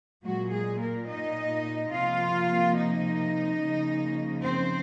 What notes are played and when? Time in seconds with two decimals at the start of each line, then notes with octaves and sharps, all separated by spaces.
0.23 A#2 F#3 G#3 F#4
0.51 G#3 G#4
0.79 A#3 A#4
1.07 D#4 D#5
1.91 C3 F3 A#3 F4 F5
2.75 D#4 D#5
3.60 C#3 F3 A#3
4.43 C4 C5